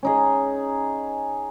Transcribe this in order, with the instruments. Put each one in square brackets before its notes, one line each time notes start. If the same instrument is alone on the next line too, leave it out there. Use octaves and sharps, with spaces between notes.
[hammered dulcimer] C#4 D#4 G#4